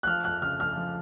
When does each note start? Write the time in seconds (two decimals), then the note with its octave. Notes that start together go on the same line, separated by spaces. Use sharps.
0.03 F#6
0.06 F3 F6
0.24 F2 F#6
0.42 C#3 F6
0.60 F2 F6
0.77 F3